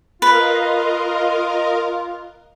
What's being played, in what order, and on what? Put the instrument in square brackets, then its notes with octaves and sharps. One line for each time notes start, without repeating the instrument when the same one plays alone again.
[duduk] F4 [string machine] A#4 D#5 F5 [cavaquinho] B4